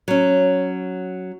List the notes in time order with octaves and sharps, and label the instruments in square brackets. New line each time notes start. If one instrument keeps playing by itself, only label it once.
[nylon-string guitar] F#3 C#4